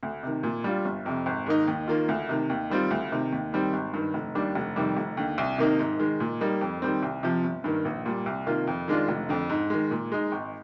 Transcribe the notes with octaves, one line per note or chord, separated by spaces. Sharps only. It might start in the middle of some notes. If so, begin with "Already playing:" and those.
D2
C3 D#3
A#2
G3 D4 F4
G1
F2 C3
G#1
G#2 D#3 A#3 D#4
D#2
D#3 A#3 F4
D2
C3 D#3
D#2
D#3 G3 C4 F4
D2
C3 D#3
D#2
D#3 G3 C4
G#1
G2 D#3
F1
D#2 D#3 G3 D4
F1
F2 C3 D#3 G3
F1
D#2 D3
C2
C3 D#3 A#3 D#4
G#2
D#3 G#3
A#2
G3 A#3 D#4
F2
D#3 G3 C4
C2
C3 F3
G1
G2 D#3 A#3
A#1
A#2 G3
C2
C3 D#3 A#3 F4
F2
D#3 G#3 D4 F4
F1
F2 D3
G#2
D#3 G#3
A#2
G#3 D#4
G#1